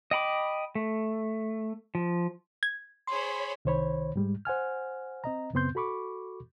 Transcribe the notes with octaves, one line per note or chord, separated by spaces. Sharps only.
D#5 G5 B5 D6
A3
F3
G#6
G#4 C5 C#5 B5 C6
C2 D#3 C5 C#5 B5
G#2 G3 G#3
C5 F#5 G#5 F6
C4 D#5 A#5
F#2 C#3 B3 C4 C6 G6
F#4 A4 B5 C#6 D6